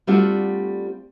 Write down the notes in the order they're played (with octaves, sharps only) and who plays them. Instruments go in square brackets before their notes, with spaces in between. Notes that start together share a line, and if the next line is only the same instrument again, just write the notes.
[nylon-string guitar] G3 A3 C4 D4 F4 F#4